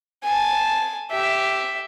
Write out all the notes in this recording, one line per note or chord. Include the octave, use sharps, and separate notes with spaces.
G#5 A5
G4 E5